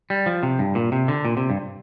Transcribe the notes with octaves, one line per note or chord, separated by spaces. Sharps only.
G3
F3
C3
G2
A#2
C3
D3
A#2
C3
G2